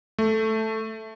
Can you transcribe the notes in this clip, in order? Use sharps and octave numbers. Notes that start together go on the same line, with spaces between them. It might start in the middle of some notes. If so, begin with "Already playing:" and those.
A3